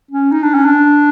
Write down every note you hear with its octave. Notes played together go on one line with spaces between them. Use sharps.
C#4
D#4
D4
C#4
D4